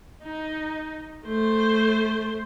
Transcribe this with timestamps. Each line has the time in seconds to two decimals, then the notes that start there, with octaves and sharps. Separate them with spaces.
0.23 D#4
1.26 A3 C5